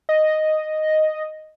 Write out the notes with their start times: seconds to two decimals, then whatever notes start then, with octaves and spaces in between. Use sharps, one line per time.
0.09 D#5